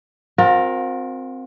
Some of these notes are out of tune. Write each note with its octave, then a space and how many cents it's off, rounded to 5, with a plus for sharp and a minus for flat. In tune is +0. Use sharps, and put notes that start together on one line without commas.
C4 +0 F4 +45 A#4 +0